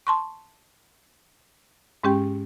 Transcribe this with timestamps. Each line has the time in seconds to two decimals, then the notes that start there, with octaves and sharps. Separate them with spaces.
0.07 A5 C6 C#6
2.03 G#2 G#3 C#4 G4 G5